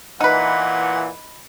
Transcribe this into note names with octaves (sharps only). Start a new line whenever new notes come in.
A#2 E3 D#4 B4 F#5